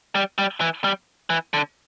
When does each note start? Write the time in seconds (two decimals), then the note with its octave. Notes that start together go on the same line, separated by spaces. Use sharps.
0.15 G3
0.38 G3
0.61 E3
0.84 G3
1.30 E3
1.54 D3